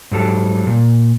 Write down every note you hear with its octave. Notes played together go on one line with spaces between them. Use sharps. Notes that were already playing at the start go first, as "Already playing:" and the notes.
G#2 F#3 G3 A4
A#2